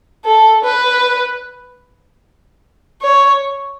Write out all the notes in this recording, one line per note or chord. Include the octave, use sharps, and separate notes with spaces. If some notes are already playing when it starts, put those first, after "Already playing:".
A4
B4
C#5